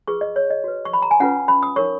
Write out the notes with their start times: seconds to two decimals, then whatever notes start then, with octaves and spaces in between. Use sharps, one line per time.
0.08 F4 G#4 B4 C#6
0.21 D#5
0.36 C#5
0.50 D#5
0.64 F#4 B4
0.85 C#6
0.93 B5
1.02 A#5
1.11 G#5
1.20 C#4 F4 B4 F#5
1.48 B5
1.63 D#6
1.76 D#4 A#4 C#5 C#6